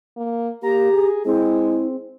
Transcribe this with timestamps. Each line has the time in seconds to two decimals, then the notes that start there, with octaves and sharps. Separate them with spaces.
0.17 A#3
0.63 A#3 G4 A#5
0.93 G#4
1.25 G#3 C4 E4